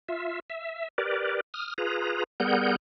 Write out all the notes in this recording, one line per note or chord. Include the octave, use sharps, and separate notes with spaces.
F4 E5
E5
G4 A#4 B4 D5
D#6 F6
F4 G#4 B4 A#5
G3 B3 G#4 A#4 F#5 G6